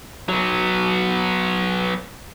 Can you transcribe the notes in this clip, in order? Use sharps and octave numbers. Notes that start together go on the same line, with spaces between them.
F#3 B3